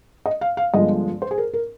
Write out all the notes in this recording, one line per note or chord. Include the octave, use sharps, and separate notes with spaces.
D#5
F5
F5
G1 G2 F3 G#3 D#5
C5
G#4
A#4
A#4